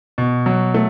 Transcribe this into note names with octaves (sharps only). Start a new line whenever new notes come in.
B2
F#3
A3